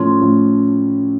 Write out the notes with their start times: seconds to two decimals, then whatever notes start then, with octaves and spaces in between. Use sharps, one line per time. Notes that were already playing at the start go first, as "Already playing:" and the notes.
Already playing: A2 F3 A3 C#4 C6
0.21 A2 F3 A3 C#4